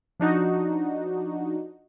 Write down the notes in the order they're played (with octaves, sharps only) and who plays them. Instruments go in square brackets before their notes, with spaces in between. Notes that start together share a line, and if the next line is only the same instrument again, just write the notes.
[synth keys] F3 D4 D#4 F#4